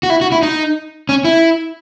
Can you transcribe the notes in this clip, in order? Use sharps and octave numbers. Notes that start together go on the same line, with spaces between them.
F#4
E4
F#4
E4
D#4
C#4
E4